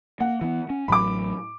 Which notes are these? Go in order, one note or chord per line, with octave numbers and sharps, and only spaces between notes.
A#3 F#5
E3 B3
C#4
A1 A2 F#3 B5 D6